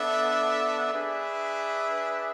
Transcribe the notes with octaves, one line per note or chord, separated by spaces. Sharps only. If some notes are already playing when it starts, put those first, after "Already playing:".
Already playing: B3 D4 A4 E5
D4 G#4 B4 E5